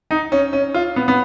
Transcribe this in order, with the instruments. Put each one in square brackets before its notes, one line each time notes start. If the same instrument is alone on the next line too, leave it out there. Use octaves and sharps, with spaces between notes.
[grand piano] D#4
C#4
C#4
F4
B3
B3